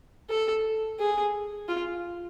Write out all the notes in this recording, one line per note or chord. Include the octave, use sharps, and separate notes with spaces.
A4
G#4
F4